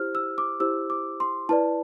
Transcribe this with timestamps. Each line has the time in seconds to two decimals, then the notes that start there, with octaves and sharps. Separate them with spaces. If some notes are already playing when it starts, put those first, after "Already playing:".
Already playing: E4 G4 C5 F6
0.15 E6
0.38 D6
0.60 E4 G4 C5 E6
0.90 D6
1.20 C6
1.49 E4 B4 D5 A5